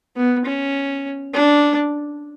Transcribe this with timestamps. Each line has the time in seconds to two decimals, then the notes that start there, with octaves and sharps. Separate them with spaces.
0.16 B3
0.46 C#4
1.34 D4